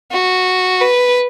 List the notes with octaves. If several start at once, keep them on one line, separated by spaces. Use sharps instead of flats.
F#4
B4